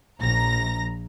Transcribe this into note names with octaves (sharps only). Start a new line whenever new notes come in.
A#1 A#5 A#6